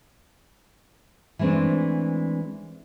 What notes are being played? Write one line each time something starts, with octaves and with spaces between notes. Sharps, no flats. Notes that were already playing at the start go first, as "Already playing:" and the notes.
E3 G#3 A3 C4 D4